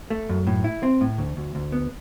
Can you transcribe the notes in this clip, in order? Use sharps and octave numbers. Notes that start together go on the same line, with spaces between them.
A3
F#2
A2
E4
C4
A2
D2
D2
D2
B3